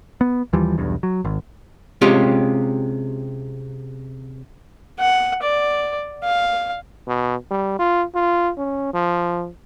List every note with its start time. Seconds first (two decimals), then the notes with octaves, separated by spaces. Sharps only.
0.21 B3
0.53 D#2 E3 F3 G3
0.78 B1 E2 G2
1.03 F#3
1.25 G#1
2.01 C3 G#3 C#4 F4 G4
4.99 F#5
5.42 D5
6.24 F5
7.07 B2
7.51 G3
7.79 F4
8.15 F4
8.58 C#4
8.93 F3